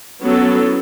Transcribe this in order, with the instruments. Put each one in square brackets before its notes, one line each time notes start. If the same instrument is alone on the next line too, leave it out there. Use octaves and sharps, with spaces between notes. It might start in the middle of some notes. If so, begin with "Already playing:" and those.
[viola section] F#3 B3 A4 [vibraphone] C#4
[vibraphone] E4